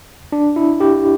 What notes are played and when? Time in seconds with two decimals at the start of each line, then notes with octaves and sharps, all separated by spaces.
0.32 D4
0.56 E4
0.80 G4